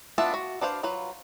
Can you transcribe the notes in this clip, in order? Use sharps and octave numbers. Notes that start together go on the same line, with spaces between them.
B3 D4 F4 E5 A5
F#4
D4 B4 C5 F5
F#3 F4 B4